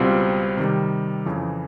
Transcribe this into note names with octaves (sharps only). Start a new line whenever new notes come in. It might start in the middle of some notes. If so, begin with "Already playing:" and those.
Already playing: C#2 B2 G3 C4 F4
C3 D#3 G3
F2 C#3 E3